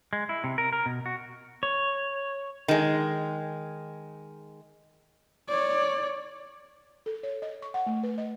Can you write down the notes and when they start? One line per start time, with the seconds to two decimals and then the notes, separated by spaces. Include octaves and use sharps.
0.13 G#3
0.29 E4
0.44 C3
0.58 A#4
0.73 A#4
0.86 B2
1.06 F#4
1.63 C#5
2.68 D#3 G#3
5.48 C#5 D5
7.06 A4
7.23 C#5
7.42 D#5
7.62 C#6
7.74 F#5
7.86 A3
8.03 B4
8.18 D#5